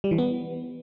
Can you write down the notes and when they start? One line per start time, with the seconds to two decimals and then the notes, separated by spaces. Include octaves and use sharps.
0.04 G3
0.11 E3
0.18 B3